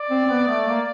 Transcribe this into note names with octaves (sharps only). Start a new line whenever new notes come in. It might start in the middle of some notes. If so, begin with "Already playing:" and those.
Already playing: D5
C4
C4
B3
A3
A#3